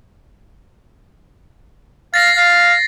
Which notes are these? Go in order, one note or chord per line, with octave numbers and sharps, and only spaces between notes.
F5 A6 A#6 C7
F5